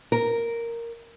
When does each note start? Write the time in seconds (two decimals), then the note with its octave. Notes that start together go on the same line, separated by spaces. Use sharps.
0.12 A#4